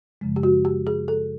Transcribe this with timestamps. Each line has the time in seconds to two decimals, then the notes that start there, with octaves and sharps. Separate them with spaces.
0.21 F#2 C#3 F3 G#3
0.36 G4
0.43 F#4
0.65 G4
0.87 G#4
1.08 A4